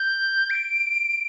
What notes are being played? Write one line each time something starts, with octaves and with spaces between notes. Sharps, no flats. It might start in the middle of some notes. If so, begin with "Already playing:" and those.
Already playing: G6
D7